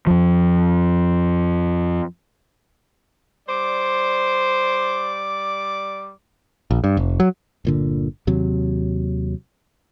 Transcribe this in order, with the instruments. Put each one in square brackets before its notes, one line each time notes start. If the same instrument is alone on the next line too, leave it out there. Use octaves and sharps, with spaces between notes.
[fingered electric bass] F2 F3
[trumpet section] G3 D5 D6 [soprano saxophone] C5
[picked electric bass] A#1
G2
F1
F#3
[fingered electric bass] G1 A#2 D3
D#2 C3 F#3